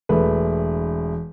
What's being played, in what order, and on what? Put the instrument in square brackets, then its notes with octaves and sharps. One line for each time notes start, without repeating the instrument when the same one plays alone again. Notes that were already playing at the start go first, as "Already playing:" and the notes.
[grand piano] E1 A3 B4